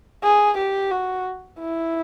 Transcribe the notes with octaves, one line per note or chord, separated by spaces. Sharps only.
G#4
G4
F#4
E4